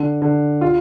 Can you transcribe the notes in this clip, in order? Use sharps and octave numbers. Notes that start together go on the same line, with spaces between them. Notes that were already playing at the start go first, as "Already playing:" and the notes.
Already playing: D3
D3
F4